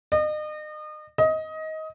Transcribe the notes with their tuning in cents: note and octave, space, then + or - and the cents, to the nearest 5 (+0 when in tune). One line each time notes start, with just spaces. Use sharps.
D#5 -35
D#5 +20